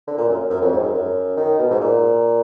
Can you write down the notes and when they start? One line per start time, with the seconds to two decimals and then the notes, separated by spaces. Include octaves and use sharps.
0.07 D3
0.17 A#2
0.29 F#2
0.50 F#2
0.61 F2
0.72 G#2
0.83 F#2
0.94 F#2
1.37 D#3
1.59 B2
1.71 G#2
1.81 A#2